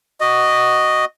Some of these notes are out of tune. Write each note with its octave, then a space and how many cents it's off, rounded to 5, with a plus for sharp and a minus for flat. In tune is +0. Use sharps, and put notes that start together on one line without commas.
F#4 +10 D#5 -10